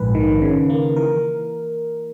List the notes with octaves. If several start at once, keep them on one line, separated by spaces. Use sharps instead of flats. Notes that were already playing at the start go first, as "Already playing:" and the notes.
Already playing: A#1 G#2 B4
D#3
C#3
A#3
E3 A#4